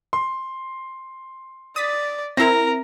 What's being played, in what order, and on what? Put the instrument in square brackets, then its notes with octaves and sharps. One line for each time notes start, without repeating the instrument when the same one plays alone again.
[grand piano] C6
[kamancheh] D5 [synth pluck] D#6 A6 B6
[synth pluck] C4 E4 A#5 [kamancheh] A#4 [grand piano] A#6